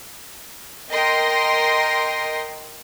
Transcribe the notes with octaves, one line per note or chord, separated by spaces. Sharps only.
A#4 D#5 G5 C6 A#6